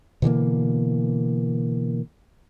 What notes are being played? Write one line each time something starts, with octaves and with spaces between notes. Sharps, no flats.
B2 D3 E3 A#3